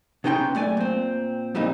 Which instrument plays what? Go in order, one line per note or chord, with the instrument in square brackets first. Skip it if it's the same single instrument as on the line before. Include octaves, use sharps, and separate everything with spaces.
[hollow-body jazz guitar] B2 B3 C#4 D#4 G5 C6
F#2 A3 D5 G#5
A#2 C4
F2 A#2 G3 C4 D#4